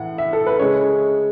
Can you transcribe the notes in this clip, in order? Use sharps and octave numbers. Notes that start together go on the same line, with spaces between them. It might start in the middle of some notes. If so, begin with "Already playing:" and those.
Already playing: A2 E3 F#5
E5
A4
B4
C#3 G#3 C#5